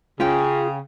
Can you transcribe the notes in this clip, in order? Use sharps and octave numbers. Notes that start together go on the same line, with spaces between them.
C#3 C#4 F4 G#4 G5